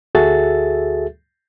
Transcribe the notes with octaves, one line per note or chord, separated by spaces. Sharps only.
D2 F#4 G#4 A4 E5 A6